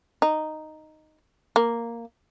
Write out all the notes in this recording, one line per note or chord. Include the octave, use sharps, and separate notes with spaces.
D#4
A#3